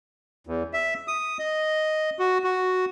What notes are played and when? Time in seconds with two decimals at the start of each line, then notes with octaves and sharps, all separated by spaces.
0.47 E2
0.73 E5
1.08 D#6
1.39 D#5
2.19 F#4
2.44 F#4